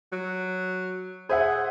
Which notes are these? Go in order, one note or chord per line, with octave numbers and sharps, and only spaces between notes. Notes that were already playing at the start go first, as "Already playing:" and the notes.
F#3
G#4 C5 E5 F#5